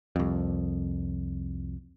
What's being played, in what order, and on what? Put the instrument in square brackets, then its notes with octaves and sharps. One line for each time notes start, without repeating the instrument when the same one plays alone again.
[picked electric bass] C2 F2